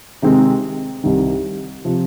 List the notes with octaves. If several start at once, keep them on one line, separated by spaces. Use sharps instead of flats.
C3 D#3 G#3 C4
C2 C3 D#3 G3
C3 F3